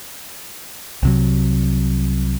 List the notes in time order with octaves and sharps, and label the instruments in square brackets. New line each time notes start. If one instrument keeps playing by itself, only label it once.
[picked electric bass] C2 C3 F#3